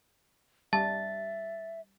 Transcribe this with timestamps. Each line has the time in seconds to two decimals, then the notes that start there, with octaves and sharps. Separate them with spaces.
0.73 G3 E5 A5 A6